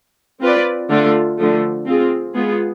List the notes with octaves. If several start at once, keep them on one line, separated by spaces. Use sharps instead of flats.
C4 F4 B4 D5
D3 A3 D4 F4
D3 F3 A3
C4 F4 G#4
G#3 B3 F4 G#4